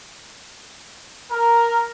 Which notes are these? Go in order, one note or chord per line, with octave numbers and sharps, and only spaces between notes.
A#4